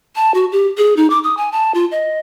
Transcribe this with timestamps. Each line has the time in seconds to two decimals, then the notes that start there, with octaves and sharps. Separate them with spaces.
0.16 A5
0.34 F#4
0.52 G4
0.77 G#4
0.97 D#4
1.10 D6
1.24 D#6
1.37 G#5
1.52 A5
1.74 F4
1.91 D#5